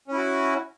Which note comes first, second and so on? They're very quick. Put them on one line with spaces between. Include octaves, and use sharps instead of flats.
C#4 E4 F#4